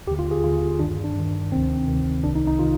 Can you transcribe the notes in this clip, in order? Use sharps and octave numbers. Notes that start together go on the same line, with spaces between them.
D#2 D3 G4
F4
G#4
D#2 D3 F4
G2 D#3 D4
D4
G2 D#3
D2 C3 D#3 C4
D2 C3 D#3
C2 C3 D#3 D4
D#4
D#4
C3 D#3 F4